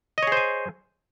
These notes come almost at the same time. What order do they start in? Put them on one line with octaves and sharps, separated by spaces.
D#5 C#5 G#4 C5 G#5